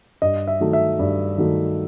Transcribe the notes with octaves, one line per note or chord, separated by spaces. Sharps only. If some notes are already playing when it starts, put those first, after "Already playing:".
G2 D#5
E5
D#3 F#3 A3
E5
G2
D#3 F#3 A3